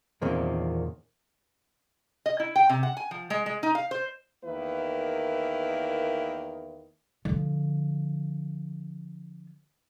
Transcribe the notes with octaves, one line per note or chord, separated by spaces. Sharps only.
E2 A#2 D#3 A#3 C4 C#4
D#5
E4
G5
C3
F#5
G#5
F3
G#3
G#3
D#4
F5
C5
E2 D#3 A#3 E4 B4
D3 F3